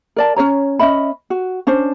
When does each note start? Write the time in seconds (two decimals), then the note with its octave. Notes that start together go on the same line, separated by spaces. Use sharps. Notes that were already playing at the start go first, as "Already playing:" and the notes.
0.16 A#4 D5 A5
0.36 C#4 C5 C#5 A#5
0.79 C#4 D#5 E5 B5
1.30 F#4
1.67 C#4 D4 C5